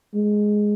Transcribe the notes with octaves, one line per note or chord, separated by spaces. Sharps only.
G#3